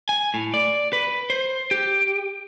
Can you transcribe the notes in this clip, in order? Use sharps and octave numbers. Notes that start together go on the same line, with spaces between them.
G#5
A2
D5
B4
C5
G4